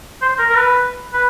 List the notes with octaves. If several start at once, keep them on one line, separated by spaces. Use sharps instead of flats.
C5
A#4
A#4
B4
B4